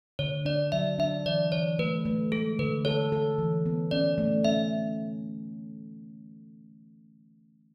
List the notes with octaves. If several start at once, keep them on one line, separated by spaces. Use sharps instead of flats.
D3 C#5
D4 D5
F#3 E5
D4 E5
E3 D5
E3 C#5
A3 B4
A3
G#3 A4
D3 B4
A4 C#5
A4
E3
B3
C#4 D5
A3
C#4 E5